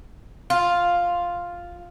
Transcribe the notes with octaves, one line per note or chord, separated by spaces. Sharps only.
F4